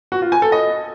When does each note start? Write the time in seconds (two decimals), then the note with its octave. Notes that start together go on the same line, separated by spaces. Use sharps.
0.12 F#4
0.22 F4
0.32 G#5
0.42 A4
0.52 D#5